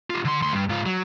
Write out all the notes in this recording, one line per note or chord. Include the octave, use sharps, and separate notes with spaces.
F4 G4
D3 C6
D2 C6
G2
G#2 F4
F#3